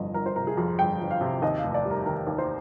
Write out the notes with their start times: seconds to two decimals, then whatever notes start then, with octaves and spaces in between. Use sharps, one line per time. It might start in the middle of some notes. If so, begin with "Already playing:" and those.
Already playing: G1 F2 C3 D#5
0.14 G1 A#4
0.26 C5
0.36 C3 A#4
0.47 G#4
0.57 F2
0.79 G1 G5
1.01 G1
1.11 F5
1.21 C3
1.42 D#2 D#5
1.58 F5
1.64 F1
1.74 D5
1.85 G3
1.91 A#4
2.06 D#3 A#4
2.27 D#2
2.38 C5